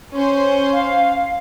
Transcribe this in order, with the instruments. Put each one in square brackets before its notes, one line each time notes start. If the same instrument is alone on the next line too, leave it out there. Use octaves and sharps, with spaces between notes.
[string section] C#4 C5
[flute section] F5